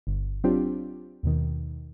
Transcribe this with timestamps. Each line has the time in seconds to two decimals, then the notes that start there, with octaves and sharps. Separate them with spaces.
0.07 G1
0.44 F#3 C4 D4 F4 G4
1.23 D#2 B2 D#3